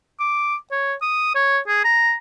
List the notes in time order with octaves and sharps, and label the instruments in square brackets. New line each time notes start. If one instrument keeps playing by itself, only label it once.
[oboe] D6
C#5
D#6
C#5
G#4
A#5